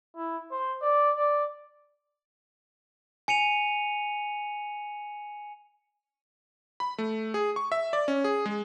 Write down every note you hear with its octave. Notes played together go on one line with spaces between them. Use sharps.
E4
C5
D5
D5
G#5 C#7 D#7 F7
B5
A3
G#4
C#6
E5
D5
C#4
G#4
G#3